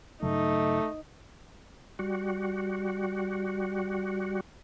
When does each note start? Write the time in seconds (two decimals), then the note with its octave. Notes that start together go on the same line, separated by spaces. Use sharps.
0.22 G2 C#3 F#3 A3 D#4
1.99 G3 F#4